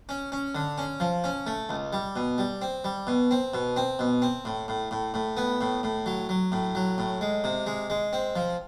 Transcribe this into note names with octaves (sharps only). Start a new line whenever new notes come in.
C#4
C#4
D3
C#4
F3
C#4
A3
C#2
G3
B2
G3
C4
G3
B2
C4
B2
C4
B2
C4
A2
A2
A2
A2
B3
A2
A2
F#3
F#3
A2
F#3
A2
G#3
C3
G#3
G#3
C4
F3